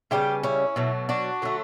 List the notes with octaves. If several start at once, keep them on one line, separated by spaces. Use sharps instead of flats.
C#3 G3 B3 E4 G4
C#4 E4
B2 F#3 A3
D4 F#4
D3 F#3 A3